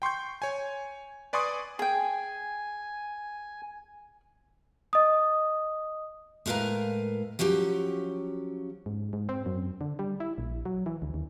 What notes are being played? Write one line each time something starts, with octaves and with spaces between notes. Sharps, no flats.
G5 C6 C#6 G6
C#5 G#5
B4 D5 G#5 C6 C#6 D#6
G#4 G5 G#5
D#5 D#6
A2 G#3 A#4 B4 F5 A#5
F3 F#3 C#4 G4
G#2
G#2
C4
F#2
D3
G3
E4
A#1
F#3
E3
D2
D#2